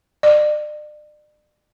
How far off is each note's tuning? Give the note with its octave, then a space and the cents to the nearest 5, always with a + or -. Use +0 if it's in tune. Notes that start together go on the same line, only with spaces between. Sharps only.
D5 +40